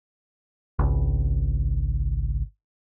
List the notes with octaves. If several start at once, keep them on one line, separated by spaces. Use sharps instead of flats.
G#1 C#2